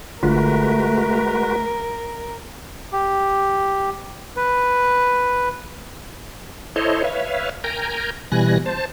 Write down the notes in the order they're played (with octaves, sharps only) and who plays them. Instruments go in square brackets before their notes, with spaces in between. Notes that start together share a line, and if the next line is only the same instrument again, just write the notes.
[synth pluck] G1 D3 F4 [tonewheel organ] G#3 F#4 B4 [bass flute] A3 [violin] A#4
[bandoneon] G4
B4
[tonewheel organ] E4 A4 C5 C#5 D#5
B4 C#5 E5 F5
A#4 G5 G#5 A#5
B2 E3 G3 G#5 F#6 A#6
C5 A5